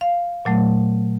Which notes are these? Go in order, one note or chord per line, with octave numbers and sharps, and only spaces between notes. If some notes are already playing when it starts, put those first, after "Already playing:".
F5
A#2 F#3 A3